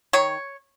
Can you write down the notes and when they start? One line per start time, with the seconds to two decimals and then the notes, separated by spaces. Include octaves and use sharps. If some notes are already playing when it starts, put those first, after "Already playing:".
0.13 D#3 C#5